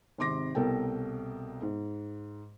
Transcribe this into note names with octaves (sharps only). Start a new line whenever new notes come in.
G#1 C3 C6 D6 A#6
C2 B2 A4 A#4 G5
G#2